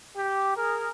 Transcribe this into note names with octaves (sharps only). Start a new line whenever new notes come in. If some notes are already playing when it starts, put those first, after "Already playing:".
G4
G#4 A#4